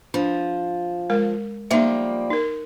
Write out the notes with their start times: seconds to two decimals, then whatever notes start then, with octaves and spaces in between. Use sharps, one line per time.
0.14 F3 D4
1.10 G#3 A#4
1.71 F3 G3 A#3 D#4 E5
2.30 D#4 A#4